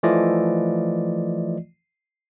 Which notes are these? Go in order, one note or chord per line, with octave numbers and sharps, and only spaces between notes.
E3 F3 A3 F4 D5 D#5